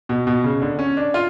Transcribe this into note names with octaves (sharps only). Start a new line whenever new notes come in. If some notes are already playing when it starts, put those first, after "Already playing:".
B2
B2
C#3
D3
C#4
D4
F4